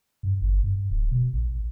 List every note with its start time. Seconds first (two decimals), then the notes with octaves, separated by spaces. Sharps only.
0.23 G2
0.41 G1
0.63 G2
0.90 D1
1.11 B2
1.33 A#1